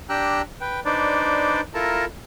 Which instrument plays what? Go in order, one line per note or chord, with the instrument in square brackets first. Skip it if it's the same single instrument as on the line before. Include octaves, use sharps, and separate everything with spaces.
[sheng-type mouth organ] D4 G4 G5 A#5 E6 F#6
B4 G5
D4 D#4 B4 C5 D5
E4 F4 A4 A#4 A5 A#5